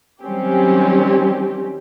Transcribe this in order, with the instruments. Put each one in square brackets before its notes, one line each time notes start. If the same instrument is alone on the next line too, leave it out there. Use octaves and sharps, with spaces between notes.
[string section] D#3 F#3 G3 C4 C#4 G4